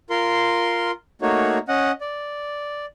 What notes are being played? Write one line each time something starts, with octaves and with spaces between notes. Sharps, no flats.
F4 A#4 C6
A3 A#3 D#4 F#4 C#5
C#4 D#5 F#5
D5